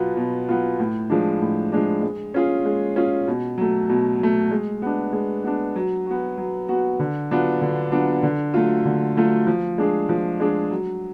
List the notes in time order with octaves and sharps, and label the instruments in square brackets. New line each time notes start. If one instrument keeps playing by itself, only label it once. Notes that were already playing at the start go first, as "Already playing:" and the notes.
Already playing: [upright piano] B2 F#3 B3 F4
B2
F#3 B3 F4
A2
F3 G#3 D4
A2
F3 G#3 D4
G#3
C#4 F4 G#4
G#3
C#4 F4 G#4
B2
F#3 A3
B2
F#3 A3
G#3
B3 D4
G#3
B3 D4
F#3
B3 F#4
F#3
B3 F#4
D3
F#3 B3 D4 F4
D3
F#3 B3 D4 F4
D3
F#3 A3 F4
D3
F#3 A3 F4
F3
G#3 D4 G#4
F3
G#3 D4 G#4
F#3